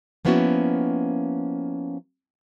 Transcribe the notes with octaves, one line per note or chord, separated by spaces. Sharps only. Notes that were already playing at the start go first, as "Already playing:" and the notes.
F3 A#3 B3 C#4 E4 F#4